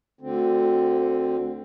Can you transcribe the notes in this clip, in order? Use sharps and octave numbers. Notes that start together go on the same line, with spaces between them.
D2 D3 C4